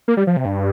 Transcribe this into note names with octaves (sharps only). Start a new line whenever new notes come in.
A#3
G3
F3
C3
G2